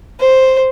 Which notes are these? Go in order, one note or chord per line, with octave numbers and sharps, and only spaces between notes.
C5